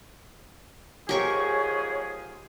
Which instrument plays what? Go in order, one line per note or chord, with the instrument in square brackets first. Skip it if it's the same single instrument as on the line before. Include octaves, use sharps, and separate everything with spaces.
[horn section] G#2 F3 G#4 [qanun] G4 A#4 C#6 [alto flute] C#5